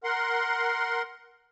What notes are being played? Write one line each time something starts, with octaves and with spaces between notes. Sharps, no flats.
A#4 F#5 C6